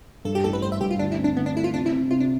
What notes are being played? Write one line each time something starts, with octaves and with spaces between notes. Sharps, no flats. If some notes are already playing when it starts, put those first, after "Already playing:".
G2 A4
G4
A1 A4
B4
G2 C5
E5
G2 G4
F4
D2 D4
E4
C4
D4
D2 B3
D4
A3 E4
F4
C3 D4
E4
C3
C3 F4
D4